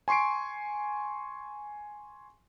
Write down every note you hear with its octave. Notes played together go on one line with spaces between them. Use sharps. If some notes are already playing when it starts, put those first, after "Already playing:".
G#5 C6 C#6 C7 D7